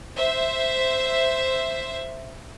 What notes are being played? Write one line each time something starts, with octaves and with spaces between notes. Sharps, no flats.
C5 E5